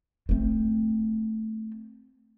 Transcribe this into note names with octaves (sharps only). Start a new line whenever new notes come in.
A3 C4